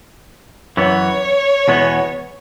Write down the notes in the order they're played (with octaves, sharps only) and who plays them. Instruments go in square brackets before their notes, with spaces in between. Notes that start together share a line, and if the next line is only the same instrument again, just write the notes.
[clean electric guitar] F#2 E3 B3 [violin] C#5
[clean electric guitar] E2 B2 G#3 B3